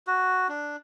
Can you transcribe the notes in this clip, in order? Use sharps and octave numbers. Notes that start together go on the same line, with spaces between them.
F#4
D4